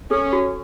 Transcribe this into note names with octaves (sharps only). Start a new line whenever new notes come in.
C#4 A4
F#4